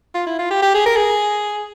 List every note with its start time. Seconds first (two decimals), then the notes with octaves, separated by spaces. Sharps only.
0.15 F4
0.27 E4
0.39 F4
0.51 G4
0.62 G4
0.74 G#4
0.86 A#4
0.97 G#4